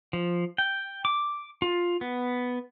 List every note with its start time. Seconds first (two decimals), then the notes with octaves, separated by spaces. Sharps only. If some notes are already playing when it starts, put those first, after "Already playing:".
0.13 F3
0.58 G5
1.05 D6
1.62 F4
2.01 B3